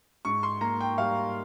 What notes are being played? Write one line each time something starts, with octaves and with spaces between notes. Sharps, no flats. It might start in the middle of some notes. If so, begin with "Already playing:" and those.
G#2 C#6
C6
A#3 A#5
G5
G3 F5